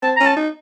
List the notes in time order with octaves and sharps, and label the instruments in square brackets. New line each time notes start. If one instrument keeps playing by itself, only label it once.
[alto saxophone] C4 [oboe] A5
[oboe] A#5
[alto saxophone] C#4
[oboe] A5
[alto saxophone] D#4